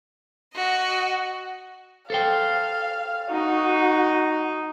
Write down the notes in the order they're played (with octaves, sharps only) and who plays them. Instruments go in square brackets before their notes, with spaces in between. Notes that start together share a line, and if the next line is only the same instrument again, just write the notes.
[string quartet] F#4 D#5
[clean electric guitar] A4 C5 G5 [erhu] F5
[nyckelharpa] D#4 [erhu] F#4